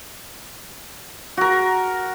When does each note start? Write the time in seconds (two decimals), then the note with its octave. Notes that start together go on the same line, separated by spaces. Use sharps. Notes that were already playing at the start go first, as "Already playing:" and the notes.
1.37 F#4 A#4